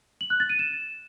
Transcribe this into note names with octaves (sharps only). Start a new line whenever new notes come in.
F#7
F#6
A6
D#7
E7